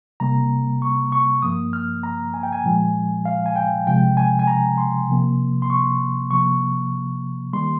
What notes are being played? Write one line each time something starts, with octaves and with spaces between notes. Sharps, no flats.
C3 G3 A#3 A#5
C#6
C#6
G2 F3 A#3 D#6
F6
A#5
G#5
G5
G#5
A#2 F3 G#3
F5
G#5
G5
C3 F3 G#3 G5
G#5
G#5
A#5
C6
C3 F3 A#3
C6
C#6
C3 F3 A#3 C#6
D#3 G3 A#3 C6